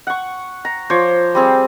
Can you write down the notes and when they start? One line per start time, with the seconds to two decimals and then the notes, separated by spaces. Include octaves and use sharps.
0.07 F#5 C#6
0.65 A#5
0.90 F3 C5 C#5 D6
1.35 G3 C4 G#4